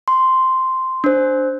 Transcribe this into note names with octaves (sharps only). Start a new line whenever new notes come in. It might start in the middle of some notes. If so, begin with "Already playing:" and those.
C6
D4 C5